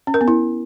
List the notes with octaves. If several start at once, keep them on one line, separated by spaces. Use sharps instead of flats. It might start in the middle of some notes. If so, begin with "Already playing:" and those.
C#4
A#4
B3
E4